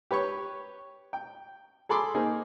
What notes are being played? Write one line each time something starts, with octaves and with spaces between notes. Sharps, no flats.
G4 B4 C#5 C#6
G5
G#4 A4 B5 C6 D6
A#3 D#4 G#4 C5